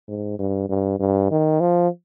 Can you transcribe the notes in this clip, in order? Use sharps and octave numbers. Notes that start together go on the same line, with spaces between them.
G#2
G2
G2
G2
D#3
F3